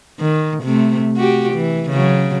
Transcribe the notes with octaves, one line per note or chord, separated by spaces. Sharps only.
D#3
C3 A3
F#4 G4
E3
C#3 F#3